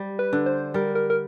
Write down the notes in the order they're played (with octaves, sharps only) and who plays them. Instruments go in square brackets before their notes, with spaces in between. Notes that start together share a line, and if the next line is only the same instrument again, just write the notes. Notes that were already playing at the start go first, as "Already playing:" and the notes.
Already playing: [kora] G3
[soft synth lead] B4
[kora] D3
[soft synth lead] C5
[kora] G3 [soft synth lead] A#4
[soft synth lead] A#4
A#4